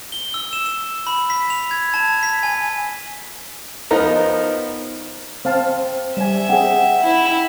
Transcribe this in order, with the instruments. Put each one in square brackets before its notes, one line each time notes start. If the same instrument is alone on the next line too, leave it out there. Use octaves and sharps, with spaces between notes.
[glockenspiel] G7
E6
E7
E7
B5
B6
F7
G#6
A5
B6
G#5
[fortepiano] F3 B3 D#4 A#4 A#5
[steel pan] C4 F5 A5 [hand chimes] C5
[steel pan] G3 G#5 [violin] E5
[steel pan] C4 G#4 [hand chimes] F#5 G5
[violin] E4